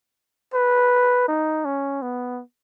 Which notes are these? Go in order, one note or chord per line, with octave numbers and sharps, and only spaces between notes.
B4
D#4
C#4
B3